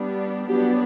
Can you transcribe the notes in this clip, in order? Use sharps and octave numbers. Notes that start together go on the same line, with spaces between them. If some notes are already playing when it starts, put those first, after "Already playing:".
Already playing: G3 B3 D4
F#3 B3 D4 G4